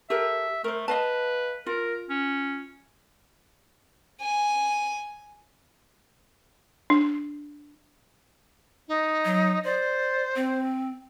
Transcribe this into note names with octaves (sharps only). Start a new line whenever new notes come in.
G4 A4 A#4 E5
A3 A#4 C5
B4 D#5 F5 A5
F4 A#4
C#4
G#5
D4
D#4
F#3
C5 D5
C4